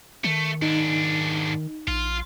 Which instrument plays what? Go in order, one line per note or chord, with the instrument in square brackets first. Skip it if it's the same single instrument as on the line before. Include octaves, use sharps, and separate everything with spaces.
[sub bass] D#3 [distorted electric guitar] A3
[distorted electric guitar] G#2 D4 [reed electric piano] D#4
[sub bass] A#1 [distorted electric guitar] F4